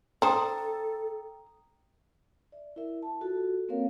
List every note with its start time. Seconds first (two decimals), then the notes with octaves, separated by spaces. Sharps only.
0.22 D4 A4 C5 G5 A#5 D#6
2.52 D5 E5
2.76 E4 A#4 E5
3.03 A5
3.21 F4 F#4 A4
3.69 A#3 C4 C#4 A#4 C#5 F5